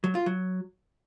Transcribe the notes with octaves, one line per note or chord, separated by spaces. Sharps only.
F#3
F4
F#3